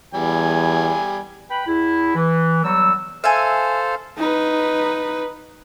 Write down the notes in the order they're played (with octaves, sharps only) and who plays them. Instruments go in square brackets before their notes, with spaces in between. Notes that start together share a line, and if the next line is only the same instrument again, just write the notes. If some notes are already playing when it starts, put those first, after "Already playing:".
[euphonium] E2 [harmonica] G3 G#5
[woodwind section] B4 G5 B5
E2 E4
E3
E2 F#3 G3 E6
[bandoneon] A4 C5 F5 [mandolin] E5 G#5
[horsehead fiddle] D#4 B4